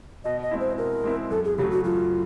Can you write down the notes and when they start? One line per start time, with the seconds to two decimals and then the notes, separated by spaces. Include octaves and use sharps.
0.24 B2 D#5
0.42 D#5
0.51 G#3 C4 E4
0.60 C5
0.78 B2 A#4
1.04 G#3 C4 E4
1.31 F#2 A4
1.45 G#4
1.58 C#3 F#3 A3 G4
1.71 F#4
1.85 F#2 F4